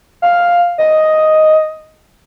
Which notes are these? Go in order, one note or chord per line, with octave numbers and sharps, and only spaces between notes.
F5
D#5